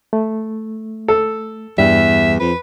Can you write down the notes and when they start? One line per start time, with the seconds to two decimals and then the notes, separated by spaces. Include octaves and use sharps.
0.13 A3
1.08 A4
1.78 E2 G2 G3 E5
2.40 F2 B4